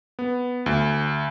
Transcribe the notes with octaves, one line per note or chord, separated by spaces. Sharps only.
B3
D2